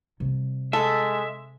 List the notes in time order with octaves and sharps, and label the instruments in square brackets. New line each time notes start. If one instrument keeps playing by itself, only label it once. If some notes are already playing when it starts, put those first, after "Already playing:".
[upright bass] C3 G3
[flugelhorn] G#3 [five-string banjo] A4 [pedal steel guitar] E5